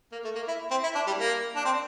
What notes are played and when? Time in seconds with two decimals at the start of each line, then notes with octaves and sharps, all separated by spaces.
0.12 A#3
0.24 A3
0.35 A#3
0.48 E4
0.71 C4
0.83 E4
0.95 D4
1.07 G3
1.18 A#3
1.56 D4
1.65 C4